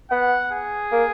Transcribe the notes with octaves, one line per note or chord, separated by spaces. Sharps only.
B3 F#5
G#4
A#3